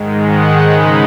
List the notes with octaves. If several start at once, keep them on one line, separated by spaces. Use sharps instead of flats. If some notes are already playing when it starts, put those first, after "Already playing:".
Already playing: G#2 D#3 G#3
F#5
C#3 G#3 D#4 B5